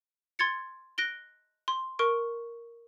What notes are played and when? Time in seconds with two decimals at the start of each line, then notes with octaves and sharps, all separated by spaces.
0.39 C6 G#6 A6 C#7
0.98 F#6 A#6 D7 G7
1.68 C6
1.99 A#4 C#6 D7